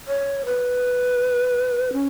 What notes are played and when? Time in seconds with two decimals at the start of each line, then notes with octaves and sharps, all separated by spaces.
0.08 C#5
0.45 B4
1.93 C#4